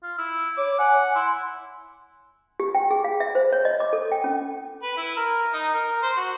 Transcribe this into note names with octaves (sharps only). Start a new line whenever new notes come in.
F4
E4
C#5 D6
F#5 G#5
E4 C6
G4
G5
G#4
F5
E5
C5
C#5
D#5
D6
A4
G5
C#4
B4
E4
A#4
D#4
A#4
C5
F#4